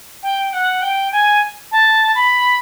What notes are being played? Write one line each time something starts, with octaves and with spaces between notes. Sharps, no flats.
G5
F#5
G5
G#5
A5
B5